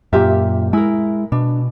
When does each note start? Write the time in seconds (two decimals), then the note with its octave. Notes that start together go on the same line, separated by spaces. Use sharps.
0.13 F#2 A#2 F4 G4 E5
0.73 G#3 E4 A#4
1.32 B2 D4